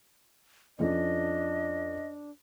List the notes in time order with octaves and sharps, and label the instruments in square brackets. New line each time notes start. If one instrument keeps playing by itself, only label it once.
[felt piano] F2 F3 C#4 [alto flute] D4 [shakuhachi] D#5